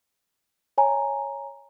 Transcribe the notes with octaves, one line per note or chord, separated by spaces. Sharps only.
C#5 G#5 A#5